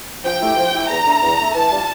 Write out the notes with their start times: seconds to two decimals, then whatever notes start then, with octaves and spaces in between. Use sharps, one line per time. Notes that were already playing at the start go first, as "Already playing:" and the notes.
0.24 F3 G5
0.40 A3 E4 G4
0.56 F3
0.73 A3 E4 G4
0.89 E2 A#5
1.06 D3 A3 E4
1.22 E2
1.38 D3 A3 E4
1.55 E3 A5
1.70 G3 D4 F4